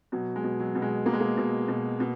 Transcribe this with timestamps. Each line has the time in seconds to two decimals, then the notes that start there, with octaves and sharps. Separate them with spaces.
0.12 B2 F#3
0.36 G#3
0.44 B2
0.59 F#3
0.75 B2
0.82 G#3
1.06 B2 A#3
1.13 G#3
1.20 A#3
1.37 B2
1.68 B2
2.00 B2